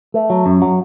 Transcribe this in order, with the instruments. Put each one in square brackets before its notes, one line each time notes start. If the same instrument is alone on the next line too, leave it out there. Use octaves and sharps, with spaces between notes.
[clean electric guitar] A3
F#3
F#2
F#3